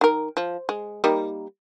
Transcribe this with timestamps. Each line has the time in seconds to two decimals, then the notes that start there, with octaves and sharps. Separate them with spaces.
0.01 D#3 A#4
0.37 F3
0.69 G#3
1.04 G3 A#3 D#4